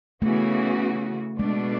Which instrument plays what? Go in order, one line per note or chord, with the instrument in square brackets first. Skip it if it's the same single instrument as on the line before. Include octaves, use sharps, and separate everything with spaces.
[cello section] C#3 E3 B3 F#4 [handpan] A3
[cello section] B2 A3 D4 [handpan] G#3